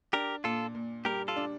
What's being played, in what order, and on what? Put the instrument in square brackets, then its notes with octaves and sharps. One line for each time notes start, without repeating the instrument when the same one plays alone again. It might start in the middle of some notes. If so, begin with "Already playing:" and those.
[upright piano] D4 [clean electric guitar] G4 A#4
[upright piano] A#2 [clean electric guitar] F4 A4
[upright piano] A#2
[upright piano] G3 [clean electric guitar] G4 A#4
[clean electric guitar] F4 A4
[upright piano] D4